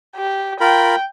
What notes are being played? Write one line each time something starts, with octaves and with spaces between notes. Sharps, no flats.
G4
F4 A#4 G5 B5